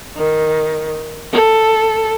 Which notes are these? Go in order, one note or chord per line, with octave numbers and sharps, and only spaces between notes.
D#3
A4